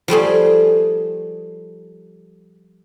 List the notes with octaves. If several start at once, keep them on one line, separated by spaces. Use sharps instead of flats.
F3 G3 A3 G#4